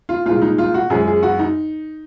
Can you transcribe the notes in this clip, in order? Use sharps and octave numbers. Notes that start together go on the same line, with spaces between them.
F4
C2 A#2 G#3 F4
D#4
F4
F#4
F#2 F3 G#3 G#4
G#4
F#4
D#4